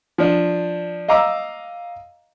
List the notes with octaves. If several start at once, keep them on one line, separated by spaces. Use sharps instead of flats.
F3 D4
D#5 F5 A#5 D6 E6